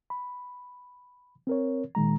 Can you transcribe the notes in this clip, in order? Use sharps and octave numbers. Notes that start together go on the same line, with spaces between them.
B5
C4 A#4 C#5
A#2 D#3 G#3 A#5